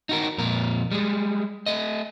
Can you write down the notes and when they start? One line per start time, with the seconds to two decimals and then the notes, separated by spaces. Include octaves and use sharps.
0.09 D#4 F#4 A#4
0.38 F2 A#2 A#4
0.91 G3 G#3
1.66 A3 D#5